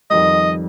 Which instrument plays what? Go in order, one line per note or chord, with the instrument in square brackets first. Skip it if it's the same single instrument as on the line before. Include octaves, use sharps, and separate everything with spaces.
[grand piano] F2 D#3 G3 [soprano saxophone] D#5